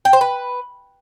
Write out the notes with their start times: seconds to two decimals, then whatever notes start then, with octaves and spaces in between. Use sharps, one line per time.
0.05 G5
0.13 C5
0.21 B4